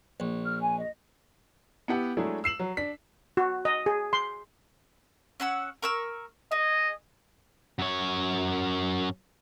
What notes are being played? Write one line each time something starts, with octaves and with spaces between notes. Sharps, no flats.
A#1
F6
G#5
D#5
B3 E4 G4 F#5
F#3 G#3 A3 D4 E4 G#4
E6 C7 E7 F#7
F#3
D4 B6
F#4
D#5
G#4
C6
C#4 F#5 E6
A#4 C#6 E6
G#4 D#5
F#2 C#5